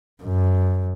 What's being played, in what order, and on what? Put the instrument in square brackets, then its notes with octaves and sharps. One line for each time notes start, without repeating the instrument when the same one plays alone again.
[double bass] F#2